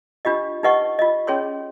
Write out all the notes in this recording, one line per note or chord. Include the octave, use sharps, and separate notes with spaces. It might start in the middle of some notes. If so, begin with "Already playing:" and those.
D4 F4 G4 D#5
D#4 G4 B4 D#5 F#5 C#6
F4 D#5
C#4 G#4 C#5 C6